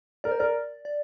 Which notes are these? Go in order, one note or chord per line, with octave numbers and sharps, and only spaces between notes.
A#4 D5
C5
A#4 D5
D5